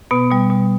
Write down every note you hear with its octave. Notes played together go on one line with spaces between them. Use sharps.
B2 B3
B2 G3
B2